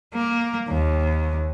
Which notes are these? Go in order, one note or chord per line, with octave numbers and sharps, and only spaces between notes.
A#3
D#2